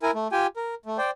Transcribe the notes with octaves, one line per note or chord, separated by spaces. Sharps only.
E4 A#4 G#5
A3
F4 G4 G5 G#5
A#4
A3
C5 D5 G5